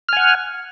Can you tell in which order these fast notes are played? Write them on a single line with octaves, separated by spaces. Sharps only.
F6 G#5 F#5